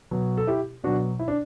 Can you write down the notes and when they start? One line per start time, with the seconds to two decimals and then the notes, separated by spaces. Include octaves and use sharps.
0.11 B2 F#3
0.38 A4
0.47 E4 G4
0.84 B2 F#3 D4 F#4
1.19 E4
1.28 D4